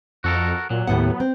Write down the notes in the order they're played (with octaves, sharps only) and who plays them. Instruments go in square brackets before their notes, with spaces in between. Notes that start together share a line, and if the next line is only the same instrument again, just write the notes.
[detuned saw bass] F2 [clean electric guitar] F#4 A4 A#4
[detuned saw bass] A#2 [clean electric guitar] F#3
[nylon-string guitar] D#2 A2 F#5 [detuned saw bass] B3
[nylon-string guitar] C4